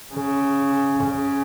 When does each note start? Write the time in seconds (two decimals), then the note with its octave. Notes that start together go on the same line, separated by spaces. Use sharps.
0.14 C#3
1.04 C#3